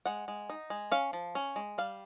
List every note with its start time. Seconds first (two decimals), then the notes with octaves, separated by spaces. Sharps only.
0.06 G#3 F#5
0.28 G#3
0.50 D#4
0.70 G#3
0.92 C#4 F5
1.13 F3
1.35 C#4
1.56 G#3
1.78 G3 F5